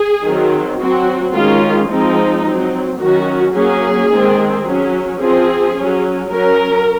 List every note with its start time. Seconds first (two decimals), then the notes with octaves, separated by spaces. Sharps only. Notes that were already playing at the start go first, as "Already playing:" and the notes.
Already playing: G#4
0.25 D#3 F#3 C4
0.79 F#3 C4 F#4
1.35 D#3 G#3 C#4 F4
1.90 F3 G#3 C4 D#4
2.45 F#3 C4
3.00 D#3 F#3 C#4 F#4
3.54 F#3 A#3 C#4 G#4
4.10 D#3 G#3 C4
4.66 F#3 C#4
5.21 F3 C4 G#4
5.74 F#3 C#4
6.29 F#3 C#4 A#4